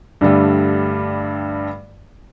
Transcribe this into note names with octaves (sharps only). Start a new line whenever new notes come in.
G2 D3 G3 A3